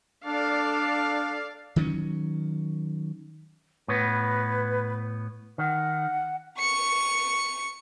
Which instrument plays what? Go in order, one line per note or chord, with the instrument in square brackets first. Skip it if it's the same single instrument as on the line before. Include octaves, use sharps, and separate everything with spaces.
[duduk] D4 [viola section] A4 D5 F5
[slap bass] D#3 F#3 A#3 C#4
[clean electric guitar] A2 B3 [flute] B4
[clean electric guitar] D#3 [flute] F#5
[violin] C#6 C#7